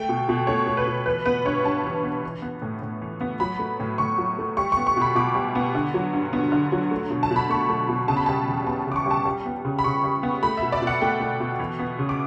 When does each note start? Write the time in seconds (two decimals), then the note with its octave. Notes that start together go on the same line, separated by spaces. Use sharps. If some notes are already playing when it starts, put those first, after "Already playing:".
Already playing: A3 G5
0.09 B2
0.29 B2
0.47 A3 C#5
0.67 A3
0.77 B4
0.87 B2
1.06 E3 B4
1.26 B3 B4
1.45 G2 C#5
1.64 G2 A5
1.84 E3
2.03 B3
2.23 E3
2.42 B3
2.62 A2
2.82 A2
3.02 E3
3.21 B3
3.40 F#3 B5
3.59 A3
3.80 A2
3.98 A2 C#6
4.18 F#3
4.38 A3
4.57 G3 C#6
4.72 C#6
4.77 B3
4.87 C#6
4.97 B2 B5
5.15 B2 D6
5.35 G3
5.55 B3
5.75 D3
5.94 F#3
6.14 G2
6.33 B3
6.52 D3
6.72 F#3
6.91 A3
7.10 B2
7.23 A5
7.31 B2
7.36 B5
7.50 A3 C#6
7.70 A3
7.89 B2
8.08 C#3 A5
8.17 B5
8.26 G3 A5
8.48 E2
8.67 B3 A5
8.87 C#3 D6
8.96 C#6
9.06 G3 A5
9.25 G3
9.46 B3
9.65 C#3
9.79 B5
9.84 C#3 C#6
10.04 G3
10.23 B3
10.43 A3 B5
10.57 B2 E5
10.72 D5
10.82 B2
10.87 F#5
11.01 A3 G5
11.20 A3
11.40 B2
11.59 E3
11.79 B3
11.99 C#3
12.09 D6